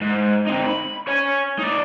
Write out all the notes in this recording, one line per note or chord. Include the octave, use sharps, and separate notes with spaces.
G#2
C4 D#4
B5
C#5 G#5
D#4 D5